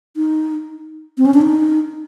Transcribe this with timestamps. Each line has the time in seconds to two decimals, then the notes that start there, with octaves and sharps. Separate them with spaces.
0.16 D#4
1.18 C4
1.26 C#4
1.34 D4
1.42 D#4